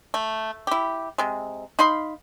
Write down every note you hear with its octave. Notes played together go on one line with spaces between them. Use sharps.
A3
E4 G4
C3 G#3
D#4 F5 B5 C6